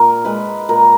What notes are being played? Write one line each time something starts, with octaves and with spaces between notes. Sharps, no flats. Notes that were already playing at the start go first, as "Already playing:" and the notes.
Already playing: A#2 A#4
G#3 B4
A#2 A#4